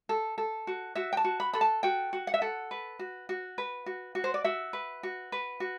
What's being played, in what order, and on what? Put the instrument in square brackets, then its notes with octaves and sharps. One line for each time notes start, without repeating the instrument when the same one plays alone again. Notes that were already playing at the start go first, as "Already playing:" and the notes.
[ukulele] A4
A4
F#4
F#4 E5
G5
A5
F#4
B5
A4 B5
A5
F#4 G5
F#4
F#5
E5
A4 F#5
B4
F#4
F#4
B4
F#4
F#4
C5
D5
F#4 E5
B4
F#4
B4
F#4